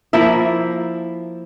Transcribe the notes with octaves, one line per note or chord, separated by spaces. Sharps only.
F3 A#3 E4 E5